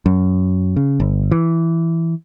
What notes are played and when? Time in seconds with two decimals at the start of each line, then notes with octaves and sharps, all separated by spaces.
0.06 F#2
0.76 C#3
1.00 G1
1.31 E3